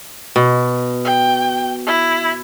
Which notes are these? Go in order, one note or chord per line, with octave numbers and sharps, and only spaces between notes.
B2
G5
E4